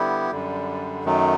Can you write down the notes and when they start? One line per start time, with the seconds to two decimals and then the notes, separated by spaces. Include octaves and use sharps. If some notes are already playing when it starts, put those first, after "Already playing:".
Already playing: D3 G3 B3 E4 G4
0.31 F#2 D3 G3
1.04 F#2 D#3 F#3 A3